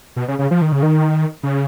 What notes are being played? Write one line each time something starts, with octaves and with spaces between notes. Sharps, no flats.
B2
C#3
C#3
F3
D#3
C#3
D#3
C#3